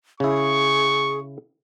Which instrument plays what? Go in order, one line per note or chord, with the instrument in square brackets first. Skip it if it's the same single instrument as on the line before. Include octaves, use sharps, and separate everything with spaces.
[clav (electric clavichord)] C#3 E4 [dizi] G#4 [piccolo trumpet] C#6